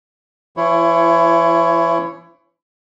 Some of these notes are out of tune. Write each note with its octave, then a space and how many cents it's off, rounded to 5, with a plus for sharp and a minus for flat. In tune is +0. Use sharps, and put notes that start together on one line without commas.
E3 +45 E4 +25 C#5 +0